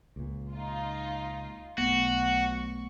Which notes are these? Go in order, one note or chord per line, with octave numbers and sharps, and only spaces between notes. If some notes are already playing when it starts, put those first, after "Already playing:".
C#2 A#2
D#4 F4
B1 A3 B3 F#4 C#6